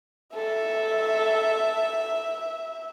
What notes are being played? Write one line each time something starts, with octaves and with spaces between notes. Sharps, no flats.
A4 E5